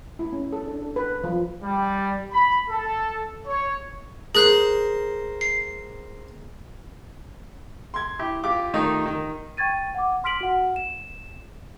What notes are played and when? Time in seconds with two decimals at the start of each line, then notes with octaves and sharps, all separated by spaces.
0.19 E4
0.33 C#4
0.53 A4
0.67 D4
0.82 A4
0.96 B4
1.24 F3
1.63 G3
2.32 B5
2.69 A4
3.46 C#5
4.35 G#4 A#4 C5 F#6
5.41 C7
7.94 C6 G#6
8.19 E4 G4
8.44 F4 G4 D6
8.74 D#3 A3 D#4
9.06 D#3
9.57 G5 C#6 G#6 A6 D#7
9.95 F#5 D6
10.24 C6 F6 B6 D7 F#7
10.41 F#4 F#5
10.76 E7